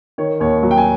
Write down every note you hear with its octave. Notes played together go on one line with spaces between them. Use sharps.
D#3 C#5
D#2 C#5
F#3
G5
G#5